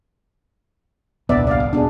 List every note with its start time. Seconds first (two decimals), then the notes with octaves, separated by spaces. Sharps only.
1.29 D#1 C2 G2 B3 D5 E5
1.47 D5 F5
1.60 D1
1.73 D#1 B2 D4 G#4